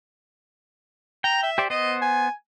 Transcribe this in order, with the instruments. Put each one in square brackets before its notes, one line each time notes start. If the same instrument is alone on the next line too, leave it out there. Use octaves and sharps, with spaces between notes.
[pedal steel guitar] G5 [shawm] A#5
[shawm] E5
[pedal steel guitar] G4 C5 D5
[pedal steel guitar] B3 C5 [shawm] D#5
[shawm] G#5